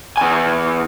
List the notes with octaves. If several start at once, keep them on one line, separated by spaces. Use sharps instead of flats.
E2 G#5